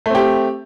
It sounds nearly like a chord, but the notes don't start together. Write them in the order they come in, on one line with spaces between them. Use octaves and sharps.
A3 C4 G4